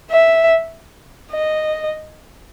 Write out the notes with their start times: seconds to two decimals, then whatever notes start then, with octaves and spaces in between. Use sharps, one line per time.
0.11 E5
1.32 D#5